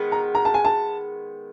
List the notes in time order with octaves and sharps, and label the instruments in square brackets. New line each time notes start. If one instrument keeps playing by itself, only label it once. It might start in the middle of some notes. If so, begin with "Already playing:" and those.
Already playing: [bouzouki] D#3 G#3 B3
[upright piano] A#5
A#5
A5
G#5
A5